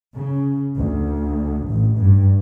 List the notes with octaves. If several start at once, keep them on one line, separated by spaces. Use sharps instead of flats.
C#3
D2
A1
G2